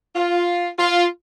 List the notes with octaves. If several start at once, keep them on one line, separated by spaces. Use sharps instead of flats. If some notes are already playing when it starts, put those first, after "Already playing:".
F4
F4